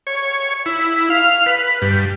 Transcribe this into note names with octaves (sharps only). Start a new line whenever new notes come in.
C#5
E4
F5
B4
G2